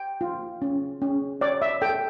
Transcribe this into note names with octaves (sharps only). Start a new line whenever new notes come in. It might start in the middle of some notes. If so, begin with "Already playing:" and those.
Already playing: G5
F4
C#4
C#4
C#5 D5
E5
A4 G5